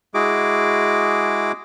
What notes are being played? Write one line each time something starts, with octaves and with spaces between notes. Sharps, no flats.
G#3 E4 F#4 G#4 D6